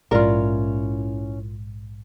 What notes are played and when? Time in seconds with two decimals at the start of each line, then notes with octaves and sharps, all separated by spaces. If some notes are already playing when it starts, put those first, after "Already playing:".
0.11 A#1 G#2 C#4 E4 F4 A#4 D5